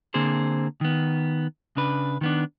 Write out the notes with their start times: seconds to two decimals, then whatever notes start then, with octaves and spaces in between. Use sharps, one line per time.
0.14 D3 A#3 C4 G#4 C5
0.81 D#3 B3
1.76 C#3 D4 B4
2.21 D#3 B3 D4